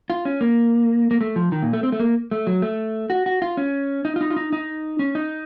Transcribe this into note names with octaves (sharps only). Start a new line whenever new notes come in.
F4
C#4
A#3
A#3
A3
F3
D#3
A#2
A3
C4
A3
A#3
A3
F#3
A3
F#4
F#4
F4
C#4
D#4
F4
D#4
F4
D#4
D#4
C#4
D#4